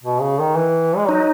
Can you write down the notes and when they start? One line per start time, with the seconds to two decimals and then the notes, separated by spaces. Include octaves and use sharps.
0.03 B2
0.21 C#3
0.39 D#3
0.56 E3
0.97 G#3
1.09 F#3 D#4